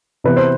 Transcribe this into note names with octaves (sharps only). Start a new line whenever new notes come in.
C3 E3 B3 B4
C5